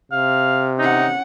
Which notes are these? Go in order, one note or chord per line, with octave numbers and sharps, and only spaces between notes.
C3 F5
C#4 D#4 F#5